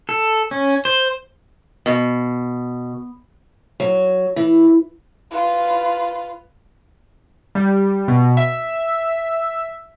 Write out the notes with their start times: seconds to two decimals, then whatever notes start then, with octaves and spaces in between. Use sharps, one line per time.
0.09 A4
0.51 C#4
0.85 C5
1.86 B2
3.80 F#3
4.36 E3
5.31 F4 B4
7.55 G3
8.08 B2
8.37 E5